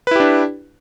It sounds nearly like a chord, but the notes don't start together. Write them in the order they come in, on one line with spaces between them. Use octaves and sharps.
B4 E4 G4 D4